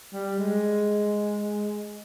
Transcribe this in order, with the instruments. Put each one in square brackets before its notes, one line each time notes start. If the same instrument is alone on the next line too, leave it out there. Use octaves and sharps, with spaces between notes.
[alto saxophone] G3
G#3